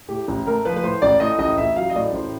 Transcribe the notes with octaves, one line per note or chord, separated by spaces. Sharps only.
A2 G4
A1
A3 A#4
F3 B4
B4
A2 C5
A1 D5
A2 D#5
A1 D#5
A1 E5
F#3 F5
D#5
A2 D5
A1 C5